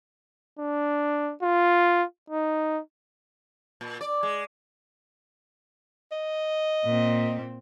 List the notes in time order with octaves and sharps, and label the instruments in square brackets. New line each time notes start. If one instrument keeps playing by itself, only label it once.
[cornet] D4
F4
D#4
[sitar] A#2
D5
G#3
[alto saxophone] D#5
[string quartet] A#2 C4